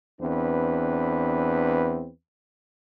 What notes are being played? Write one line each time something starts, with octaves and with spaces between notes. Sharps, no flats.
E2 C4 D4 B4